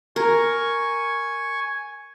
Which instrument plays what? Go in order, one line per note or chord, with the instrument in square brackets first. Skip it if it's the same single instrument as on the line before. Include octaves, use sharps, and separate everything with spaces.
[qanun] A#4 [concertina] G#5 C#6